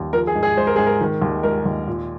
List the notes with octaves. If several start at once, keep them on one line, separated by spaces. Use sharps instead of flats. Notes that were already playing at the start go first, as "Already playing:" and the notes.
Already playing: D#2
F3 A#4
G#4
G#2
G#4
G#3 C5
A#4
G#2 G#4
A#4
D#3
D#2
G#3 A#4
D#2
A#2